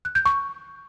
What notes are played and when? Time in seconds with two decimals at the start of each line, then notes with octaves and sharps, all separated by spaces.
0.05 F#6
0.15 G6
0.25 C#6